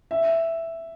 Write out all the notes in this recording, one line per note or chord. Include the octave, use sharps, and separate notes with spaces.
E5